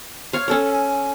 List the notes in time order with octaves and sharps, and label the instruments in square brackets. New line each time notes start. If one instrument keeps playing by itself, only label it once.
[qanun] C#5 F5
C#4 A4 C#5
[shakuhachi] G#5